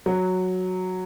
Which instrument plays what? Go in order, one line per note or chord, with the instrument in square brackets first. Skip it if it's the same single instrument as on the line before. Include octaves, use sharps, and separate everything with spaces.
[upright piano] F#3